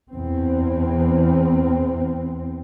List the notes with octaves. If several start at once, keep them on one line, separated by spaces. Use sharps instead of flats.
E2 C4